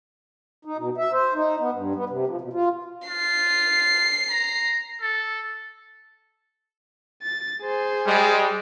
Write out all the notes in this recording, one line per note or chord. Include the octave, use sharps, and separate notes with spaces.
D#4
B2
E5
C5
D#4
B3
G2
B3
C3
F3
B2
F4
F4 C7
A#5
A4
A6
G#4 C5
G3 G#3